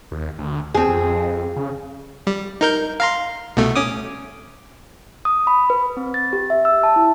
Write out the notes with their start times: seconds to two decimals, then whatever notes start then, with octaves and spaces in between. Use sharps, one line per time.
0.11 D#2
0.39 D2
0.74 E2 C4 G#4
0.88 F2
1.56 C#3
2.27 G3
2.61 D#4 A#4 G6
3.00 F5 A#5 C6
3.57 C2 B2 A3
3.76 C#4 D6 D#6
5.25 D#6
5.47 B5
5.70 B4
5.97 C4
6.14 A6
6.33 G4
6.50 E5
6.65 E6
6.83 A5
6.96 E4